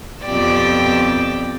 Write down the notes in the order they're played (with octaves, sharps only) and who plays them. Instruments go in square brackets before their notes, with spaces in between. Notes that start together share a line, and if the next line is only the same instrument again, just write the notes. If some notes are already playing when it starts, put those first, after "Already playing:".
[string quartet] F2 B2 G4 D5 G5 E6